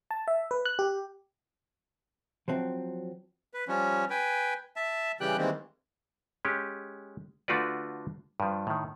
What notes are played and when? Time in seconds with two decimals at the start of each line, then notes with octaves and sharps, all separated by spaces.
0.11 A5
0.28 E5
0.51 B4
0.65 F#6
0.79 G4
2.48 F3 F#3 C4
3.54 B4
3.68 F3 G3 C#4
4.10 B4 G5 G#5
4.76 E5 A5
5.21 C#3 E3 G3 G4 G5 F#6
5.38 D#3 E3 G3 G#3 A#3 C4
6.45 G#3 C#4 G4
7.48 D3 A3 F4 F#4 B4 D5
8.40 G2 F3
8.67 A2 D#3